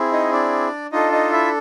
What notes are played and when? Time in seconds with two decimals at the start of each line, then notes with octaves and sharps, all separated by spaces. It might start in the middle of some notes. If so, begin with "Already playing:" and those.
Already playing: C4 E4 G#4
0.12 D#4 D#5
0.32 D4 D5
0.92 D4 D#4 F4 A4 D#5
1.12 D#4 D#5
1.32 E4 E5